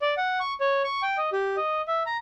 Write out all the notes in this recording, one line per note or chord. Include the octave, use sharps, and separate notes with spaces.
D5
F#5
C#6
C#5
C#6
G5
D#5
G4
D#5
E5
A#5